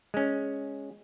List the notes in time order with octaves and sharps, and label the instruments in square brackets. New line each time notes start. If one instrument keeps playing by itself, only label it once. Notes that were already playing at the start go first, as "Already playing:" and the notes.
[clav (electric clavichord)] G#3 C#4